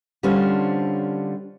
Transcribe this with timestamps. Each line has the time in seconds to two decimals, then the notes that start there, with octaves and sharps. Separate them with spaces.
0.23 D3 G3 C#4 D4 F4 C5